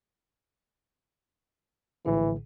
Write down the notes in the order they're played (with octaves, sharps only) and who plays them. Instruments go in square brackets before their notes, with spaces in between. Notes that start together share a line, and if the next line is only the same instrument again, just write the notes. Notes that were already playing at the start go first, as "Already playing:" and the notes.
[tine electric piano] A#1 A2 D3 [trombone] E3